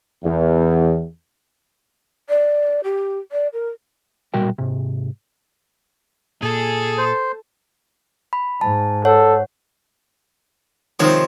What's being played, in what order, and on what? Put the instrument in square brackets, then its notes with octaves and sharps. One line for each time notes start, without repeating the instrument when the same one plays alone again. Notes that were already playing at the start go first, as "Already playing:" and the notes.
[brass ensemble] E2
[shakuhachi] D5
G4
D5
A#4
[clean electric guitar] B1 A#2 G3 F#4 A#4 G5
G#2 C3
[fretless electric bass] A#2 [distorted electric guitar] G#4 [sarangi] A4
[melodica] C5
[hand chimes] B5
[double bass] G#2 [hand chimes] A5
[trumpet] A4 [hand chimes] C#5 F#5
[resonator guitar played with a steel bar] C3 D#3 F3 [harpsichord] C5 C#5